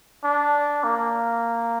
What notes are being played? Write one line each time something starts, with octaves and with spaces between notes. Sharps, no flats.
D4
A#3